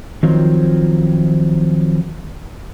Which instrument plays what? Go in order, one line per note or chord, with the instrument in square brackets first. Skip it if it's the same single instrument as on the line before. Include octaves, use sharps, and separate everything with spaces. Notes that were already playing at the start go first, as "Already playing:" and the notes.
[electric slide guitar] D#3 F3 F#3 C4 F4